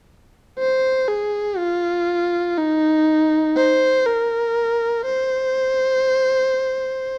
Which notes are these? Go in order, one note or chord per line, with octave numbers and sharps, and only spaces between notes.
C5
G#4
F4
D#4
C5
A#4
C5